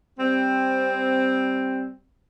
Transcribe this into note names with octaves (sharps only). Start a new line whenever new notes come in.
G3 C4